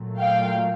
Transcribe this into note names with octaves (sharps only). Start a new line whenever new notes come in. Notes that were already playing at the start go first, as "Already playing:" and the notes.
Already playing: A#2 F#3 A3
F5 G5